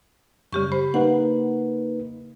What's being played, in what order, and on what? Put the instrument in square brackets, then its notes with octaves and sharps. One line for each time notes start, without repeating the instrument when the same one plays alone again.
[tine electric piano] F#2 G3 [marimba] C#3 G4 C#6
[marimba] C5 [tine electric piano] B5
[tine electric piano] A#3 D#4 B4 [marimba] F#5